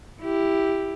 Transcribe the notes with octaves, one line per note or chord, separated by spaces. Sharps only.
E4 G4